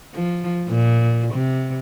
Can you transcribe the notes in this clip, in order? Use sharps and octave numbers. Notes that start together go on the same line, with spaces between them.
F3
A#2
C3